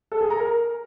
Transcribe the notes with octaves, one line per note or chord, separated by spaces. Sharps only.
A4
G#4
A#5
A#4